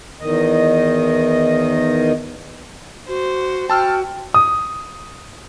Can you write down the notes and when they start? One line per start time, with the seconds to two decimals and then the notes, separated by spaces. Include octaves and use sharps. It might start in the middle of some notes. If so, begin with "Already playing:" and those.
0.21 E2 D#3 D#5
3.08 F#4 C5
3.70 F#4 G5 A5 E6 F6
4.34 D#6